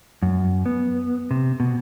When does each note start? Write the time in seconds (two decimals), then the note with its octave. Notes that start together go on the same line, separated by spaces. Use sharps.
0.22 F#2
0.66 B3
1.31 C3
1.60 B2